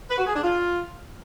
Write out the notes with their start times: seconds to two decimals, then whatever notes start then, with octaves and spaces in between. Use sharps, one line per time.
0.09 B4
0.17 F#4
0.26 G#4
0.35 D4
0.43 F4